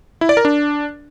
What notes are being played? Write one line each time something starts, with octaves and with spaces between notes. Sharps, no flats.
E4
D5
A#4
D4